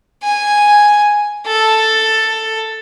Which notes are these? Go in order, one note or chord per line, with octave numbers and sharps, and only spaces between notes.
G#5
A4